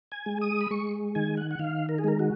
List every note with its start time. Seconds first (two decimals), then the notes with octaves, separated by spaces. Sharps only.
0.12 G#5
0.26 G#3
0.41 D#6
0.61 B5
0.71 G#3 C#6
1.15 D#3 G#5
1.37 F#5
1.51 F#5
1.59 D#3 F5
1.89 A#4
1.98 G#4
2.04 G#3 A#4
2.19 F#4